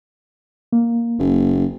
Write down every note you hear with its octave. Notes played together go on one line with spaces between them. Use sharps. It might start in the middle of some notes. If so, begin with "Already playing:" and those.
A#3
F#1